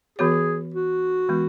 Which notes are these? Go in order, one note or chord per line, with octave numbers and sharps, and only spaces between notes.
E3 B3 F#4 G#4 C#5
F#4
E3 G#3 B3